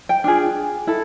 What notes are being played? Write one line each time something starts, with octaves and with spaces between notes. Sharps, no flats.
G5
D4 F4 G#4
E4 A4